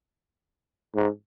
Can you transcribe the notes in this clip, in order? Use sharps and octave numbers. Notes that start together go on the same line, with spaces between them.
G#2